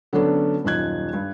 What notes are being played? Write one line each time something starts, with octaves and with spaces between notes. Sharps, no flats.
D3 F#3 B3 C#4 D4 A4
D#1 F#2 D#4 F4 F#6 G#6
G2